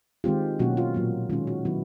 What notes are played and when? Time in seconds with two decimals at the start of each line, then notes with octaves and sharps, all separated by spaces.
0.24 D#3 G#3 C4 F4 G4
0.59 B2 F#3 A#3 C#4 F#4
0.77 F4
0.94 A#2 F#3 A#3
1.30 D#3 G#3 C#4 F4
1.47 F#4
1.65 D#3 F#3 B3 E4